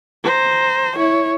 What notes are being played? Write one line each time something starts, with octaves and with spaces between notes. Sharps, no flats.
C5 A#5
E4 C#5